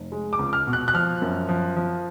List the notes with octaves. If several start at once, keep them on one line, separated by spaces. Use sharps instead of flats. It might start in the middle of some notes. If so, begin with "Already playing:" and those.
Already playing: F1
G#3
D6
C#2
F6
B2
F#6
F#6
F3 F6
F#2
F3
F3